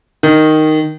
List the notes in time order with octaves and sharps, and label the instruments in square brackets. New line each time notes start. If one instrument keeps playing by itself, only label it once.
[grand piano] D#3